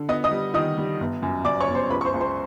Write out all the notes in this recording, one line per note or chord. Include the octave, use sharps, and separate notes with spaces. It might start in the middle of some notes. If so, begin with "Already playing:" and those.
Already playing: D3
B3 D#5 D#6
D#5 D#6
G3
D#3 D#5 D#6
G3
G1
F#2
F#2 D5 D6
C#5 C#6
G1
C5 C6
C#2 B4 B5
C#6
C5 C6
C#2
C5 C6